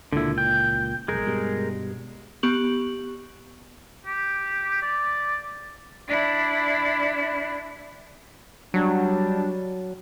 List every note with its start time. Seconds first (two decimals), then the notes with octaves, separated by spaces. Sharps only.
0.12 C#2 A#2 D3 E4
0.38 G5
1.08 F1 B1 G#3 G#4 A#4
1.27 G2 B2 G3
2.43 B3 G4 C#6 F#7
4.07 G4
4.82 D5
6.08 D4 E4
8.74 F#3 G3 D4